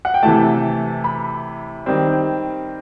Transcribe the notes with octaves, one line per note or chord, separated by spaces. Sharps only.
F#5
G5
C3 E3 A3 A5
B5
D#3 G3 C4